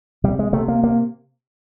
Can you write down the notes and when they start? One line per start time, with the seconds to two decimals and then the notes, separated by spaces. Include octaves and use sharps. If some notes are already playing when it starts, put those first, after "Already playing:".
0.24 C3 G3
0.39 G#3
0.53 C3 A3
0.68 A#3
0.83 A#3